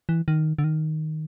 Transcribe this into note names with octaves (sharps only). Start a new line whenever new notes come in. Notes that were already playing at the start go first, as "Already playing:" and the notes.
E3
D#3
D3
D#3